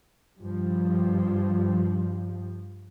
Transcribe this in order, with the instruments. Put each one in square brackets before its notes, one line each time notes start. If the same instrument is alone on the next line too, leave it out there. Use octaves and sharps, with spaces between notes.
[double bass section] G2 F3